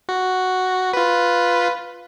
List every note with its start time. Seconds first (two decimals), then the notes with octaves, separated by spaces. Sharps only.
0.09 F#4
0.93 F4 B4